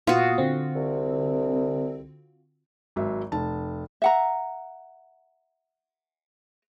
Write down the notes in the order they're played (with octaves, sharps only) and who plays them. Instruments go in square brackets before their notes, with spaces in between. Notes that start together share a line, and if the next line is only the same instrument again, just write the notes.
[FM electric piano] A#2 B3 D#6 [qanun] F4 F#4
[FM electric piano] D3 C4
[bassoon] C2
[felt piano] G#1 F#3 E5
[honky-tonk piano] F1 [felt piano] A5
[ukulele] E5 F#5 A#5